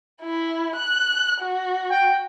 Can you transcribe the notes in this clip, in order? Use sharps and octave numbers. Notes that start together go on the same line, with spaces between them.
E4
F#6
F#4
G5